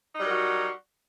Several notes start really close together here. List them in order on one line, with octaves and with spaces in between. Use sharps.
D#4 G3 F#3 A#4 F#4